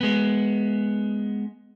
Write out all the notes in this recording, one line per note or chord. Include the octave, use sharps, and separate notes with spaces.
G#3 B3